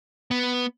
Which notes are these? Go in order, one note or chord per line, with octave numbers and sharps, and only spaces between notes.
B3